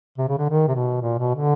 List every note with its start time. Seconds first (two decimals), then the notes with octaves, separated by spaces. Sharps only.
0.18 C3
0.28 C#3
0.38 D3
0.49 D#3
0.68 C3
0.75 B2
1.01 A#2
1.19 B2
1.35 D3